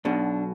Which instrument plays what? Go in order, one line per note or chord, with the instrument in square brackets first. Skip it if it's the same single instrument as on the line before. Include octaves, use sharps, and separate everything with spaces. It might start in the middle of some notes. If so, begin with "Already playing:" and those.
[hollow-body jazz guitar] B1 B2 [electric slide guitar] D4